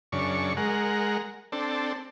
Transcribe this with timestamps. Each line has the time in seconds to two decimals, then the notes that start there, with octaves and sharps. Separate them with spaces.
0.12 F#2 C#3 D4 C#6
0.57 G#3 A#4 F#5
1.52 C4 D4 A4